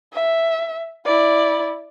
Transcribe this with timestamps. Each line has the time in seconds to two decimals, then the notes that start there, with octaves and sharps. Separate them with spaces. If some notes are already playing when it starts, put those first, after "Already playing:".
0.14 E5
1.05 E4 D5